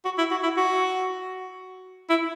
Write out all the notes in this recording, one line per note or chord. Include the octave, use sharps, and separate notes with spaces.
F#4
E4
F#4
E4
F#4
E4